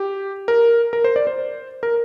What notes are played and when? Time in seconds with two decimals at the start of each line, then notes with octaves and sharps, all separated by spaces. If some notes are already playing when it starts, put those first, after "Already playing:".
Already playing: G4
0.48 A#4
0.93 A#4
1.04 C5
1.16 D5
1.27 C5
1.83 A#4